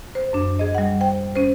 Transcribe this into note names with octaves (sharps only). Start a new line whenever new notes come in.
C5
F#2 D4
G#4 D#5
G3 F#5
C5 G5
C#4 C5